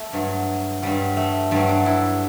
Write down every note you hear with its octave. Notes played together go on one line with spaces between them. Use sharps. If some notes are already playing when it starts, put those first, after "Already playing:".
Already playing: A3
G2 F#3
G2 F#3 G3
A3
G2 F#3 G3
D4
E4